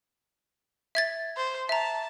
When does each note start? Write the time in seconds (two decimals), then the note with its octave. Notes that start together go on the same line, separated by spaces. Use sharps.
0.95 E5 G#6 A6
1.37 C5
1.69 E5 A5 A#5